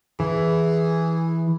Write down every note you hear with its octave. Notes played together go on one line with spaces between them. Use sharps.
E3 G#4